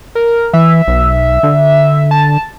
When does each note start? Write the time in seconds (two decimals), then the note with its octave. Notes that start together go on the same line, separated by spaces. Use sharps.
0.15 A#4
0.54 E3 E5
0.88 B1
1.43 D3
2.11 A5